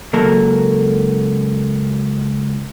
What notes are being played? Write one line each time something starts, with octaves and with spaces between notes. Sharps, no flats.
C#2 F#3 A#3 A4 A#4